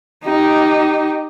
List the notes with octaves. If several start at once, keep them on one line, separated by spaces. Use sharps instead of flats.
D#4 G4